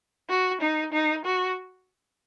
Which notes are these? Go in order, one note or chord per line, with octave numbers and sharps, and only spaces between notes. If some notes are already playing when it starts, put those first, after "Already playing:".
F#4
D#4
D#4
F#4